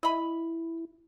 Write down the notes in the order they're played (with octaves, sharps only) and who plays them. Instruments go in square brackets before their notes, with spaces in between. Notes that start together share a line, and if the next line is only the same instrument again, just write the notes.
[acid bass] E4 [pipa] D#5 B5